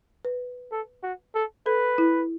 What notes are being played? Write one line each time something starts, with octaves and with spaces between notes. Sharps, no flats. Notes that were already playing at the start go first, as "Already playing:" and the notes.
B4
A4
F#4
A4
A4 B4
E4